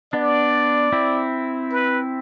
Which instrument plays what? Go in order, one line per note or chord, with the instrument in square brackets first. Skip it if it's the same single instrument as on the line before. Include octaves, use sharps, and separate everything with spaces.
[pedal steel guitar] B3 D4 [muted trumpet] D5
[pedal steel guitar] C4 E4
[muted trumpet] B4